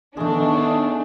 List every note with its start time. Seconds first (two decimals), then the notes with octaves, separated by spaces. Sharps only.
0.17 D#3 A3 B3 D4 G#4